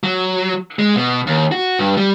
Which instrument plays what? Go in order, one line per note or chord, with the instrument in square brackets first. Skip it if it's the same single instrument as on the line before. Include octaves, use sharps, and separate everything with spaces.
[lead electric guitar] F#3
G#3
B2
D#2
F#4
G2
G3